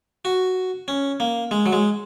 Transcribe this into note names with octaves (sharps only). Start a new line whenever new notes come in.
F#4
C#4
A#3
G#3
F#3
G#3